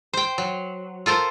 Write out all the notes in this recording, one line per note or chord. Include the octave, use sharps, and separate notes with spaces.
C5 G5
F#3
F4 A4 A#4 C5